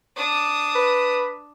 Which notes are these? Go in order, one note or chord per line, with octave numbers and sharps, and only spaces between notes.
D4 D#6
B4